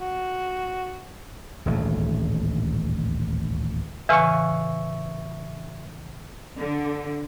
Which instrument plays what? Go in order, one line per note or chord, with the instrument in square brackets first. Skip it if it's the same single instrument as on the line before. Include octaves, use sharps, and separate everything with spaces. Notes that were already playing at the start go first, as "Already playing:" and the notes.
[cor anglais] F#4
[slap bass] D#1 A1 D2 G#2
[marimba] A2 C#3 E3 [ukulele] B4 F5 G#5 [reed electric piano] E5 C#6
[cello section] D3